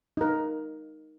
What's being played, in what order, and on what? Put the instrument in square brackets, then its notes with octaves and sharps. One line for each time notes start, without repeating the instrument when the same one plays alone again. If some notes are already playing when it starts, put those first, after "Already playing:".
[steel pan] D#4 A#4